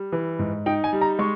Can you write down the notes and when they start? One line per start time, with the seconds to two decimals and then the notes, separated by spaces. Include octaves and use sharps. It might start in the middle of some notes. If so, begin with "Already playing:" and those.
Already playing: G3
0.12 E3
0.39 G#2
0.66 D#4 G5
0.84 G#5
0.93 G3
1.01 A#5
1.19 G#3 C#6